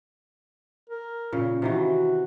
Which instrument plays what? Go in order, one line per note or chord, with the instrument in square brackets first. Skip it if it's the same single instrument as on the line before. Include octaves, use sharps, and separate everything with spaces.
[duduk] A#4
[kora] A#2 C#3
[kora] C3 D#3 E3 [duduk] F#4